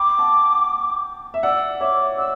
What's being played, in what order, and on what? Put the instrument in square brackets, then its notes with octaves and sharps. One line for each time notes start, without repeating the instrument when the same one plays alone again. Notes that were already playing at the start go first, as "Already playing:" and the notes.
Already playing: [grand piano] G5 B5 [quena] D6
[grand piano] F#5 A5
E5
[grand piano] D5 F#5 [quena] E6
[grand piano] C#5 E5 [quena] D6
[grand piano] D5 F#5 [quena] E6